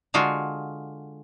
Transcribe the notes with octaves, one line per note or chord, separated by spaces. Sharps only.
D3 G#3 F4 F#4